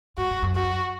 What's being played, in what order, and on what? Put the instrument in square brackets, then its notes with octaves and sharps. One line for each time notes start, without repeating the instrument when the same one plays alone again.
[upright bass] G2 [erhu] F#4
[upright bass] G2
F#2
[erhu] F#4